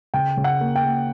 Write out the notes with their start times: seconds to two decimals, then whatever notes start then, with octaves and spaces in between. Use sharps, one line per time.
0.14 C#3 G5
0.37 C#3
0.44 F#5
0.60 A#3
0.76 G5
0.84 A#3